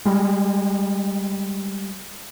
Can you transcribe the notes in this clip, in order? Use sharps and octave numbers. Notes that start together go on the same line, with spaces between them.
G3 G#3